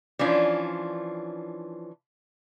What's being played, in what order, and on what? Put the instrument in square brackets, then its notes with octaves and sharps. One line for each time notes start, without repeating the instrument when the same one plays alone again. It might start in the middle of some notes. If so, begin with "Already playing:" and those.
[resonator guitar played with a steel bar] E3 F3 C#4 D4 F4